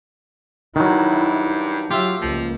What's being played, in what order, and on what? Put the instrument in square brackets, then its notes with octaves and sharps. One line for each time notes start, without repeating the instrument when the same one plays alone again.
[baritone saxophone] G2 [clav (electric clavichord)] D#3 F#3 [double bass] E4
[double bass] F#3 [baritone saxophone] F4 [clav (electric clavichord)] G4 E5
[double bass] C#2 A#3 [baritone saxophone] F3